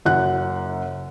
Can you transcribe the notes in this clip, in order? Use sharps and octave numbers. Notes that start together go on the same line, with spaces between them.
F#1 F#2 F#5 F#6